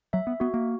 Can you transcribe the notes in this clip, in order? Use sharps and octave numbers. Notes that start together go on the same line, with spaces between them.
F#3 E5
B3
B3 F#4
A#3